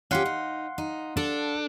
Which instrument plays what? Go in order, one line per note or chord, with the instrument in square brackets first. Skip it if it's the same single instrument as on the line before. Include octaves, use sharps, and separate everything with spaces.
[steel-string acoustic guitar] C#4 F4 G4 [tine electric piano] F5 F#5 C6
[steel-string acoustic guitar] D#4
D#4
[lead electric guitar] D4 [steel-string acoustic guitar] A4